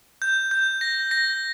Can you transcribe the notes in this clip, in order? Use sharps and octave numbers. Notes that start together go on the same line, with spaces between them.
G6
G6
A#6
A#6